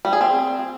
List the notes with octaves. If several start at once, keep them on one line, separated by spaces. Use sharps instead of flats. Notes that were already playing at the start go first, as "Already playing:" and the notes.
G3
G#4
C4